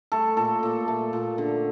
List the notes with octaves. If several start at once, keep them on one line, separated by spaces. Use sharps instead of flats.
A3 A4
A#2 A4
A#2
A3
A#2
D3